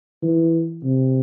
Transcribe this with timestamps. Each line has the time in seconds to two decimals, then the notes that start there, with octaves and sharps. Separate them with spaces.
0.23 E3
0.84 C3